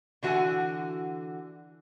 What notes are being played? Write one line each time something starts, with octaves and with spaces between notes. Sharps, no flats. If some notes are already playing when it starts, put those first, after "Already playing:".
D3 E3 F#4 C5 F#5 G#5